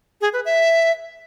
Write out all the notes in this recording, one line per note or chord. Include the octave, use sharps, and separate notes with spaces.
G#4
B4
E5